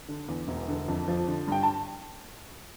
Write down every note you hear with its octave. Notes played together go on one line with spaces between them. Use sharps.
D3
E2
E1
D3
F2
F3
D3
G2 G5
A5